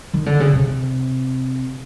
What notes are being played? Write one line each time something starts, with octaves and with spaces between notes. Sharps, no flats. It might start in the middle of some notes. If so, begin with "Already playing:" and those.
D#3
D3
C#3
C3